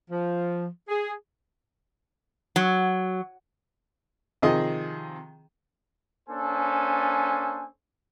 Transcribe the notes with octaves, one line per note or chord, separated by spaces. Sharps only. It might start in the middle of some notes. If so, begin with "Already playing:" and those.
F3
G#4
F#3
C3 D#3 F3 G#4 D#5
A#3 C#4 D4 A4 C5 G#5